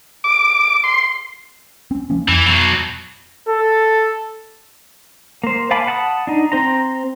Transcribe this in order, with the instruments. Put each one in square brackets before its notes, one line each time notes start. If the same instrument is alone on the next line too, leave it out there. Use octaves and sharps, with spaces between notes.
[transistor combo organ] D6
C6
[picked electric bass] C4 C#4
F3 A#3 C#4
[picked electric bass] F2 [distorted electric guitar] E3
[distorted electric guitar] B2 F#3
[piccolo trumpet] A4
[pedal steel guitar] A#3 C5
F5 G#5 A5 B5 D6
F#5 A5 B5 D6 D#6
D4 D#4
C4 C5 A#5